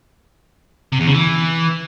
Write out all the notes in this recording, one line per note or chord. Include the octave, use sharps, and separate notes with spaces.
C3
E2
C#3
E3